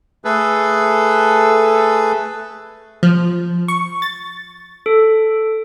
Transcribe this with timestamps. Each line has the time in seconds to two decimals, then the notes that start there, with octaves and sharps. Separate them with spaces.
0.25 A3 G#4 A4 B4
3.03 F3
3.68 C#6
4.02 A6
4.86 A4